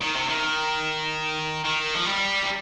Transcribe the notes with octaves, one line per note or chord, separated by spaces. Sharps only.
D#3
C3
D#3
D#3
F3
G3
C3